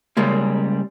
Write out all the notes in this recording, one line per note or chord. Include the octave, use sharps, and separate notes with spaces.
C#3 G3 G#3 A#3